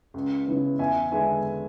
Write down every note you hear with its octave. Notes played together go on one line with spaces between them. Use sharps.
C#2
C#3 E3 B3
E2 E5 G#5
D3 G#3 B3 E5 G#5